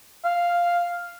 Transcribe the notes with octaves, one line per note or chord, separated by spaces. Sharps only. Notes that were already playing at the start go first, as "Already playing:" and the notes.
F5